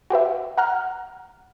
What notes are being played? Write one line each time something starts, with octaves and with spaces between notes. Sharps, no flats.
F#4 G4 B4 E5
F#5 A#5 F6 F#6